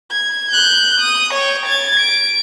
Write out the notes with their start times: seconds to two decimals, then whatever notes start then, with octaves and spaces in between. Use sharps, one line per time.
0.11 G#6
0.51 F#6 G6
1.00 D#6
1.34 C#5 G5
1.66 G#6 A6
2.00 D7